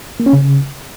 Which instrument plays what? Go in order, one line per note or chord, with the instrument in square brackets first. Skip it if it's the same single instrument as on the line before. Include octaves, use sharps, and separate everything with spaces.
[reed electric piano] A#3
C#4
C#3